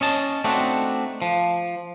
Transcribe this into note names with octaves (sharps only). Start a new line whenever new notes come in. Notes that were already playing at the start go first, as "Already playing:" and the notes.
C#4 D#5 A5
A3 C4 D4 D#4 F#4
F3